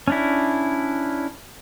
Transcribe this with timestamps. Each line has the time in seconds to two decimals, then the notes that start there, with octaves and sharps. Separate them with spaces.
0.08 C#4 D4 E4